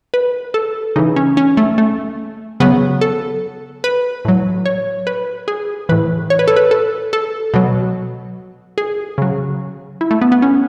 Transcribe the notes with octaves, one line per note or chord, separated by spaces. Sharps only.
B4
A4
C#3 E3 D#4
C#4
C#4
A3
A3
C#3 F#3 B3
A4
B4
A2 F#3
C#5
B4
G#4
A2 E3 B4
C#5
B4
A4
B4
A4
A4
B2 F#3
G#4
C#3 F#3
E4
A3
B3
B3
C#4